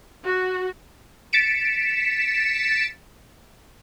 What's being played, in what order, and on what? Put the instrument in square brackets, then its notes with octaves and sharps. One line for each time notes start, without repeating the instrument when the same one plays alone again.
[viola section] F#4
[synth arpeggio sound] A6 B6 C#7 D7 E7